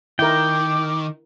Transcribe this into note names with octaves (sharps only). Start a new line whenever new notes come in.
D#3 E4 A#4 G5 D6